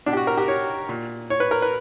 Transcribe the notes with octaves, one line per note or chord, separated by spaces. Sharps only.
B2 D4
G4
F#4
A#4
G4
C#5
A#2
C#5
B4
A#4
B4